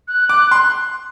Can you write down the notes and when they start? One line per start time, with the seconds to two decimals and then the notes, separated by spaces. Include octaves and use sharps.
0.08 F#6
0.29 D6 F#6
0.51 C6 F#6